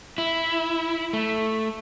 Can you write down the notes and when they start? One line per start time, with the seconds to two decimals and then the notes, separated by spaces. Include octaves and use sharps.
0.18 E4
1.13 A3